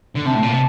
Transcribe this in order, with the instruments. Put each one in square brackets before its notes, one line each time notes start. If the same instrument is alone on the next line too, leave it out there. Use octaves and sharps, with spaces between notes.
[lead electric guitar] D3
[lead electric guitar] C3 [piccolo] A5
[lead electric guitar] A2
A#2
C3